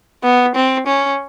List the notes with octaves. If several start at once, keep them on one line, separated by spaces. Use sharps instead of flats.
B3
C4
C#4